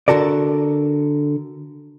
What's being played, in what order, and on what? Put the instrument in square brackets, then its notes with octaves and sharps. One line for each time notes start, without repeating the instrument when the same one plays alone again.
[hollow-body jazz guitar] D3 F#4 A4 A#4 D5